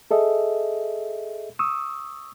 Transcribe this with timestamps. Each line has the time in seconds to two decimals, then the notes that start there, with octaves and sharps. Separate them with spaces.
0.11 G#4 A4 D#5 E5
1.59 C#6 D#6 E6